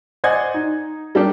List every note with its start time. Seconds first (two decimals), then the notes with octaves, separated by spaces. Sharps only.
0.24 C5 D5 D#5 F#5 G#5 G#6
0.54 D#4
1.15 G3 D4 G4 A#4